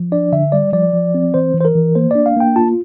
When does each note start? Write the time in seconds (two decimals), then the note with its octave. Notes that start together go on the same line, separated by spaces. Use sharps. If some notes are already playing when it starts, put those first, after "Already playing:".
Already playing: F3
0.12 D4 D5
0.32 D3 E5
0.52 G3 D5
0.73 F3 D5
0.93 F3
1.14 C4
1.34 E3 C5
1.54 E3
1.60 C5
1.65 A#4
1.75 E3
1.95 A#3 C5
2.11 D4 D5
2.26 F5
2.36 A#3 G5
2.56 F4 A5